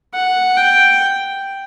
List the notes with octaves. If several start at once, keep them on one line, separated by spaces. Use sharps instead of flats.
F#5
G5